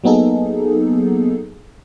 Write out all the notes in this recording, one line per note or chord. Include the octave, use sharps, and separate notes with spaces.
F#3 A#3 B3 D#4 G#4 A4